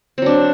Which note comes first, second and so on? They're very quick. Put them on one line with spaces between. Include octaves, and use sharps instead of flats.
C4 F#3 D4